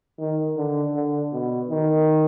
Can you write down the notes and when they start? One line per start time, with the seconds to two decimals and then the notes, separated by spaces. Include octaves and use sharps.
0.19 D#3
0.57 D3
0.95 D3
1.33 B2
1.71 D#3